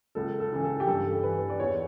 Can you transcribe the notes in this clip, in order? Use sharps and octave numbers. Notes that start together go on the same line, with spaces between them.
C#2 A4
A4
C#3 E3
A4
G4
G2 A4
E3 B4
D5
E2 C#5